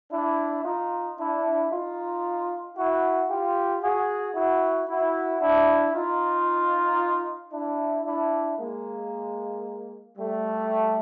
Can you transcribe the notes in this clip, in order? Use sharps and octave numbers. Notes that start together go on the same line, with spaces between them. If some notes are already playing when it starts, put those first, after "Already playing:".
D4 E4
D#4 F4
D4 E4
D#4 F4
E4 F#4
F4 G4
F#4 G#4
E4 F#4
E4 F#4
D4 E4
D#4 F4
D4 E4
D4 E4
G#3 A#3
G3 A3